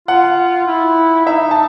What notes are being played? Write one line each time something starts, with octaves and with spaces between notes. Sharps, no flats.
F4 F#5
E4
D#4 E5
A5